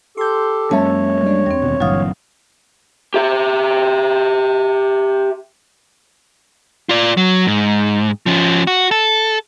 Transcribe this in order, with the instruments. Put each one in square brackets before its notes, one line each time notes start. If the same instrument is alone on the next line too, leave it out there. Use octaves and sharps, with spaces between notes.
[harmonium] G4 A4 [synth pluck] C6 G6
[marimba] F#2 A5 [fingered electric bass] F#3 G#3 A#3 [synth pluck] C#4 E5 [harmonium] C#5
[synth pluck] G3 D4
[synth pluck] E2 [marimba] G3 C4
[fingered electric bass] D#2 B2
[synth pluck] G#1 G2 F5 [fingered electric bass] A#2 D3 E3 [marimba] F#3 D#6
[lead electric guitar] G4 E5
F4 D5
F#3
G#2
F3 C#4
F#4
A4